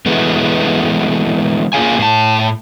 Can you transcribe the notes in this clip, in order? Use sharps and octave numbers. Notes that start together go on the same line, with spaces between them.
E3 G#3 A3 B3
A#3 F4 G#4 F5 G#5
A2 A5